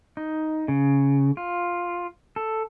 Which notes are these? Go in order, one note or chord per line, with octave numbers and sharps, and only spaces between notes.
D#4
C#3
F4
A4